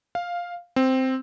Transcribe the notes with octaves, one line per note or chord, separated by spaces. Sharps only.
F5
C4